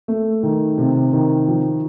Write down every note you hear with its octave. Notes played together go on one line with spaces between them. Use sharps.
A3
D#3
C3
D#3
F3